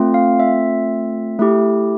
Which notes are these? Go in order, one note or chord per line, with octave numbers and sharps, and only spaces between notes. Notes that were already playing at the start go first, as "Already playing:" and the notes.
Already playing: A3 C4 F4
F5
E5
A3 E4 G4